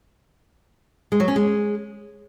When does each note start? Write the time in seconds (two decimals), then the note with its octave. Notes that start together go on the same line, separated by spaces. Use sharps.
1.12 G#3
1.20 F#3
1.28 C#4
1.36 G#3